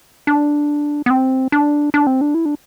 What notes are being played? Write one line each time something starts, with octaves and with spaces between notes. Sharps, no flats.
D4
B3
C4
D4
D4
C4
D4
E4
D4